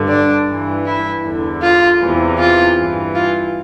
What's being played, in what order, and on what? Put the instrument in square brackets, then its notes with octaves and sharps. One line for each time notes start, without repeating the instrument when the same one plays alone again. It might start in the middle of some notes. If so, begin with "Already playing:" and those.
Already playing: [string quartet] G2 D3
D4
G2 E3
E4
E2 D3
F4
E2 C3 E3
F4
G2 E3
F4